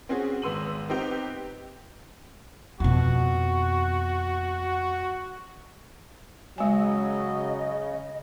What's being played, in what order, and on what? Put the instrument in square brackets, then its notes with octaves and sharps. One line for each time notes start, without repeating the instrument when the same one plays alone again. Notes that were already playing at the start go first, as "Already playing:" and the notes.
[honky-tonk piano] C4 C#4 F#4 G#4
G#1 B3 C6 E6 D#7 F#7
B3 C4 D#4 G4 B4
[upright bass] F2 B2 [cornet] F#4
[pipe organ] C#3 [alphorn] F#3 [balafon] G#3 G#5 [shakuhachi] D#5